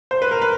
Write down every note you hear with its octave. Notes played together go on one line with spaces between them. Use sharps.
C5
B4
A#4
B4